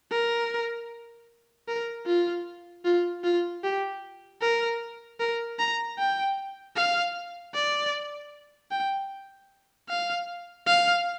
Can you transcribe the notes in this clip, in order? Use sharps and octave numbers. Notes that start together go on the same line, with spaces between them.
A#4
A#4
F4
F4
F4
G4
A#4
A#4
A#5
G5
F5
D5
G5
F5
F5